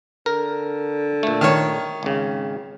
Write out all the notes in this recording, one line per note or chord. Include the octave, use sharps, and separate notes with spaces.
D3 A#4
A#2 A3
D#3 C#5
G#1 C#3